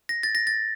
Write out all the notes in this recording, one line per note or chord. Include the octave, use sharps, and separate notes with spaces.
A#6
A6
A#6
A6